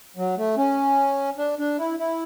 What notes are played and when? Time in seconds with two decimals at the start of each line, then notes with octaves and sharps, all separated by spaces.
0.17 F#3
0.37 A3
0.57 C#4
1.38 D4
1.59 D4
1.79 E4
1.99 E4